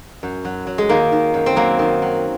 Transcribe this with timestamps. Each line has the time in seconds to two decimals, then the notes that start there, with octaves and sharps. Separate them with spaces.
0.23 F#2
0.45 F#3
0.67 F#3
0.78 G#3
0.89 D#3 A#3
1.12 D#3
1.34 F#2
1.46 C4
1.56 F#3 A#3
1.79 D#3
2.02 F#3